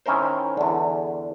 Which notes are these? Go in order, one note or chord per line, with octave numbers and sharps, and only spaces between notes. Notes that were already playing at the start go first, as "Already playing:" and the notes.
D#3 C#4 E4 A#4 C5
E2 D3